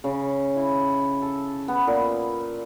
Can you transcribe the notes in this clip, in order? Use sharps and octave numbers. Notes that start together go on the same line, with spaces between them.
C#3
E4
A4
B3
A#2